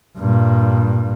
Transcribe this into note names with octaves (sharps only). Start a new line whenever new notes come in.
G2 A#2